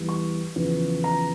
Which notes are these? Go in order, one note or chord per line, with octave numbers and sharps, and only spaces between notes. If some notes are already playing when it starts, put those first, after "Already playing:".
Already playing: E2 E3 G3
C#6
E2 C#3 F3
A#5